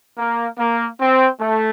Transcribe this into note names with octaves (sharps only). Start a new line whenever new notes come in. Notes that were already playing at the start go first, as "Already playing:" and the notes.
A#3
A#3
C4
A3